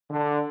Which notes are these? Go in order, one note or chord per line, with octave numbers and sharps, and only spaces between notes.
D3